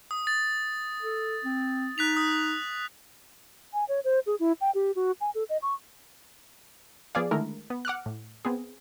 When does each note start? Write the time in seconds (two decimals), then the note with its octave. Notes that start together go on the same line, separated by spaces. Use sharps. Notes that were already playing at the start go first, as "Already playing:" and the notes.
0.11 D#6
0.27 A6
1.02 A4
1.44 C4
1.98 D#4 F#6 B6 F7
2.17 D#6
3.74 G#5
3.89 C#5
4.04 C5
4.27 G#4
4.40 E4
4.61 G5
4.75 G4
4.96 F#4
5.21 G#5
5.35 A4
5.49 D#5
5.62 C#6
7.15 F3 B3 G#4 D5 F5
7.31 D3 D#3 G#3 A3 E4 A#4
7.70 B3
7.85 F#5 D6 F6 F#6
8.06 A2
8.45 B3 C4 G#4